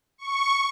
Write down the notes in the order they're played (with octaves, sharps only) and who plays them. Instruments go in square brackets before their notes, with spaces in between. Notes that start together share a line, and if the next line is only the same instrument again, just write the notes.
[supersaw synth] C#6